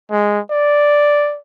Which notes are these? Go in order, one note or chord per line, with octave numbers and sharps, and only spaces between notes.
G#3
D5